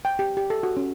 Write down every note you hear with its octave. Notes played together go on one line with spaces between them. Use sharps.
G5
G4
G4
A4
F#4
C#4